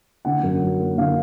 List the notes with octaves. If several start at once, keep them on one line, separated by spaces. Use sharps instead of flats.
D3 F#5
F#2
F#3
A#3
D3 F5